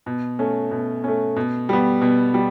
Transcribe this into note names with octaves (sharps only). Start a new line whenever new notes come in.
B2
A3 C#4
B2
A3 C#4
B2
G3 B3
B2
G3